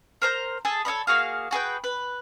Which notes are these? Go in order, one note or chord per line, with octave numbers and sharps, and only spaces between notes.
A#4 C5 A#5 G6
G#4 A4 A5
A4 C#5 D#5 B5
A#3 F#4 G#4 F5
F#4 G#4 B4 G5
B4